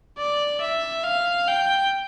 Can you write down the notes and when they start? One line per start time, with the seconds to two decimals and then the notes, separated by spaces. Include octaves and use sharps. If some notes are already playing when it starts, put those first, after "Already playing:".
0.18 D5
0.61 E5
1.03 F5
1.47 G5